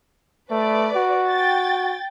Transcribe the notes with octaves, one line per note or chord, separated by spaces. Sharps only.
A3 B4 D5
F#4
G5 A6